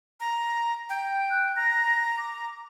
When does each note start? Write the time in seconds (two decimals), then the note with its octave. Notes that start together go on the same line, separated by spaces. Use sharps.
0.20 A#5
0.89 G5
1.31 F#6
1.56 A#5 A#6
2.18 D6